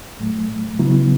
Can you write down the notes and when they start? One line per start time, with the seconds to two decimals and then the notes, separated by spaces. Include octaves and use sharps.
0.19 A2 F#3 A3
0.79 C#3 F#3 B3 E4